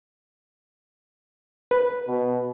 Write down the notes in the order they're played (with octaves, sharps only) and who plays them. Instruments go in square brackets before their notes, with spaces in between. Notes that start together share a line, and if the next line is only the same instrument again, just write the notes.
[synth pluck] B4
[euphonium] B2